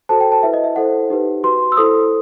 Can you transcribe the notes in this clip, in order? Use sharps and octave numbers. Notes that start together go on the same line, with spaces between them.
F#4 A4 C5 A5
G5
A5
E4 B4 E5
D#5
E5
E4 A4 C5 F#5
D#4 G4 B4
F#4 B4 C6
E6
E4 A4 C5 D#6